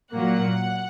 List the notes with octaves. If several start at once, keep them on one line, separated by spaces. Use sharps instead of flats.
A#2 F#3 A#3 F#5